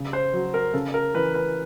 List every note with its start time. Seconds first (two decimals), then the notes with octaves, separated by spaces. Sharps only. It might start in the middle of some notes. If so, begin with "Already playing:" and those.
Already playing: C#3
0.13 C5
0.33 F#3
0.54 A#4
0.74 C#3 A4
0.94 A#4
1.14 E3 B4
1.34 B4